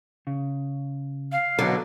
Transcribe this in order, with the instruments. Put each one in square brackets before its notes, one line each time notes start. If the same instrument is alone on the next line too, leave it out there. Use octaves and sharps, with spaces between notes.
[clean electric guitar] C#3
[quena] F5
[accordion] B2 F#3 [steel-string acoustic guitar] D3